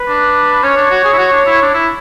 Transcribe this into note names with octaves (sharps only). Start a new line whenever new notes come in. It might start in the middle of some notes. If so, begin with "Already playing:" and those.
Already playing: B4
D4
C#4 C#5
D4
F#4
G#4
E4
F#4
D4
E4
D4
E4